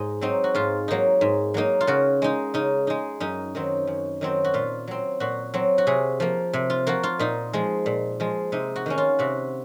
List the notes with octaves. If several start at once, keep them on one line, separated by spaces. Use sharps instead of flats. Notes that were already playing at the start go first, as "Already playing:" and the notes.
Already playing: G#2 D#5
F#3 C4 D#4
F#4
G#2 F4
F#3 A#3 D#4
G#2
F#3 A#3 D#4
F4
C#3 F#4
G#3 D#4
C#3 D#4
G#3 D#4
F#2 D#4
D#3 F#3 C4
F#2
D#3 F#3 C4
F#4
A#2 F4
F#3 C4
A#2 F#4
F#3 C4
F#4
C3 G#4
F3 A#3
C3
F4
F3 A#3 F#4
F4
A#2 D#4
F3 G#3
A#2
F3 G#3
C3 D#4
F#4
D#3 A#3 C#4
F4
C3 F#4